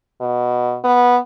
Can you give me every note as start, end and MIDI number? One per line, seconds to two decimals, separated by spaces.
0.21 0.77 47
0.84 1.18 59